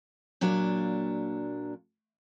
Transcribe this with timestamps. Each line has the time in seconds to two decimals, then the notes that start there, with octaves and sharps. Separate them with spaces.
0.41 A#2 F#3 A#3 D4